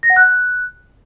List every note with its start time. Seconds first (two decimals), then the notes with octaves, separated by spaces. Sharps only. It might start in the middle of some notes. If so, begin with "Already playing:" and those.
0.03 A#6
0.10 F#5
0.16 F#6